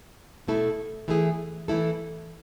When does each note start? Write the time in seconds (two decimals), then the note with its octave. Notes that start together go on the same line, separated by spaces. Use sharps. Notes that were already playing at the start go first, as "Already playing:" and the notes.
0.48 B2 A3 E4 A4
1.08 E3 A3 E4 G#4
1.68 E3 A3 E4 A4